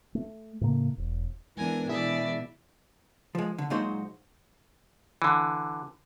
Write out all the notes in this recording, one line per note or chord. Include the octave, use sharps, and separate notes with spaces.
A3
A2 C#3 A#3
E1
E3 G#3 B3 D4 A#4 G#5
B2 E3 D4 E4 G#4 D5 E5
F3 G#3
D3
A#2 F#3 G#3 D#4 F#4 C5
D3 E3